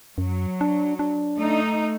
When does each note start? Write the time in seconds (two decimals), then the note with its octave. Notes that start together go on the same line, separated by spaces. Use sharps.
0.18 F#2 F#3
0.61 D4
0.99 D4
1.36 A3 D#4